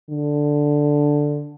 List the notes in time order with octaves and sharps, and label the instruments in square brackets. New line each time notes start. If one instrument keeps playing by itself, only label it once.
[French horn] D3